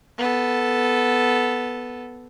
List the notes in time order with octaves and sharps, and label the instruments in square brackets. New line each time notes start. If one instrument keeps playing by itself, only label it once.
[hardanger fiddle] B3 A4